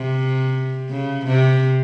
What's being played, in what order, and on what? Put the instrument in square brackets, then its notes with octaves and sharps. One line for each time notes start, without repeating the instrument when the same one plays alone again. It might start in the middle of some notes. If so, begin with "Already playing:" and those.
Already playing: [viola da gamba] C3
C#3
C3